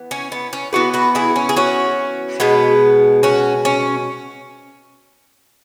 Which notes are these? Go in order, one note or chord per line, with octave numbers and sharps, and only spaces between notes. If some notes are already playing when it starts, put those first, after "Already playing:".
Already playing: E3 B3
C#4
B3
C#4
E3 B3 F#4 B4
F#4 B4
E4 G#4
C#4
G#4
C#4 F#4
B2 G#3 B3
C#4 F#4
C#4